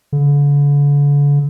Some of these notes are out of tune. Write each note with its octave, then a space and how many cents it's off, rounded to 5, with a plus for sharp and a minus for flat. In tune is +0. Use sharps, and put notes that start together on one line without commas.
D3 -40